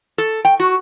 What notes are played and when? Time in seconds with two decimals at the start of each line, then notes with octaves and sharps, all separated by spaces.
0.18 A4
0.45 G5
0.60 F#4